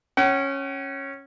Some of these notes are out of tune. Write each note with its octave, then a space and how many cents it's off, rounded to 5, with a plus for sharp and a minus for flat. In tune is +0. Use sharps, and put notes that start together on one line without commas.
C#4 -10 F#5 +45